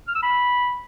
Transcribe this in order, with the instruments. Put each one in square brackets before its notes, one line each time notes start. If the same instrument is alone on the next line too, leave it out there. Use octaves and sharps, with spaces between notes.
[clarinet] F6
E6
B5